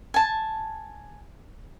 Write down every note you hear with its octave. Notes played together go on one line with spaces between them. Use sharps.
G#5 A5